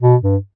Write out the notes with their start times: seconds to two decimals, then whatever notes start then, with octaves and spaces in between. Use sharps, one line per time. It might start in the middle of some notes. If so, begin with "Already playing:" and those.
0.02 B2
0.23 G2